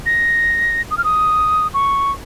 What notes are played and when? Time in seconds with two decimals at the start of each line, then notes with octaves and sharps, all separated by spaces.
0.06 A#6
0.91 D#6
0.97 F6
1.04 D#6
1.74 C#6